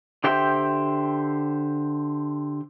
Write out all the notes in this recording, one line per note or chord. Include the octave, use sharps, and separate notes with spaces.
D3 G4 C5 E5 G5